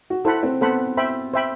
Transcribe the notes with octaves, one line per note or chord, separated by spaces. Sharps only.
F#4
E4 A4 C5 F#5 B5
C4
B3 A4 C5 F#5 B5
C5 E5 G5 B5
C5 E5 G5 B5